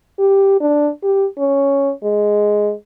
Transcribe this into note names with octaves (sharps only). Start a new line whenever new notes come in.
G4
D4
G4
C#4
G#3